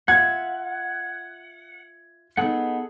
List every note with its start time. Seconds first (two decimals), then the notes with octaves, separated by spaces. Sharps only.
0.08 F4 E5 F#5 G#6
2.37 B3 D#4 G#4 A4 F#5